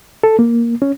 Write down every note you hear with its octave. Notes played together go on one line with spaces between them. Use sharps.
A4
A#3
C#4